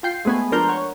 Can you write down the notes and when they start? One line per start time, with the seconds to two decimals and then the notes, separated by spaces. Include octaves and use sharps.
0.03 F4 G5 C7
0.25 G#3 A3 B3 B4 G#5
0.52 F3 D4 A#4 C6 F6 G6
0.69 C#5 F#5